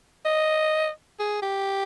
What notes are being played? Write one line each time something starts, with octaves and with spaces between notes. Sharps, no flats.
D#5
G#4
G4